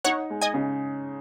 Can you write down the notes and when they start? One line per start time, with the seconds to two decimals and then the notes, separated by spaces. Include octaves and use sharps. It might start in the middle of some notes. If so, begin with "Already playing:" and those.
0.04 D#4 C#5 F#5
0.30 G#3
0.41 D#5 G#5
0.54 C#3